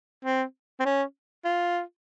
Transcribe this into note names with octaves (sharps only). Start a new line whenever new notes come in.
C4
C4
C#4
F4